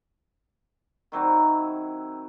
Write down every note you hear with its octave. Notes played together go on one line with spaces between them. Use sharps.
D#3 F#3 C4 E4